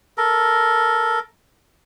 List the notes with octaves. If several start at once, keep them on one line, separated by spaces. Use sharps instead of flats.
A4 A#4